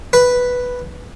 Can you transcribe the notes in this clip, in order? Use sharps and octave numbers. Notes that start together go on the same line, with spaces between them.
B4